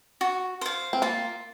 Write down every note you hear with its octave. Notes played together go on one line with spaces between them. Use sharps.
F#4
C5 F5
C4
A#3 F4